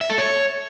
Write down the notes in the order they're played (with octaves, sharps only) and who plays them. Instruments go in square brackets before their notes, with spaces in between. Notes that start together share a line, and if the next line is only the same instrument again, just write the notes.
[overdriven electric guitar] E5
A4
C#5